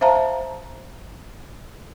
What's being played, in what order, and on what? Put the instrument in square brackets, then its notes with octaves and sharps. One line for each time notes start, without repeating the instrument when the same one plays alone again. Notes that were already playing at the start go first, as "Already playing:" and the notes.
[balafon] C5 E5 F5 A5 A#5